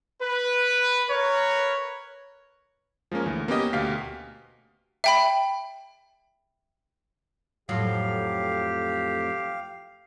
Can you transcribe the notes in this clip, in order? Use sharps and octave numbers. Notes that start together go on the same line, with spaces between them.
B4
A#4 B4 C#5
F3 G#3 A#3 C#4 A#4
D2 E3
A#3 B3 C#4 G4 D#5
D2 B2 G4 F5 B6
E5 G5 B5
F2 A2 F#3 G4 F5